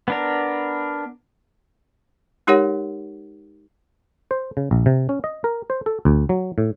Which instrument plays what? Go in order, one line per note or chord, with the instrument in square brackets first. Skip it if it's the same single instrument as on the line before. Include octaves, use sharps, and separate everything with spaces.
[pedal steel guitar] B3 D4 A#4
[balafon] G#3 D#4 G4 A#4 C#5 F#5
[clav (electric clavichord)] C5
C#3
A#1
C3
C#4
D#5
A#4
C5
A4
D2
F#3
A2